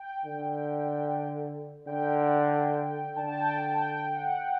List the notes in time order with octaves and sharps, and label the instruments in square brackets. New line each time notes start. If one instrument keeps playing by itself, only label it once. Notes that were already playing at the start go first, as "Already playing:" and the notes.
Already playing: [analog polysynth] G5
[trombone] D3
[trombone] D3 [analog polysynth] G5
[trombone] D3 [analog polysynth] A5
[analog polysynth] A5
G5
G5
G5
F#5